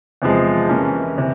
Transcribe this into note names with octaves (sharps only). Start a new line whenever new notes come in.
E2 C3 F3 G#3
C3 E3 A#3 C#4
C3 E3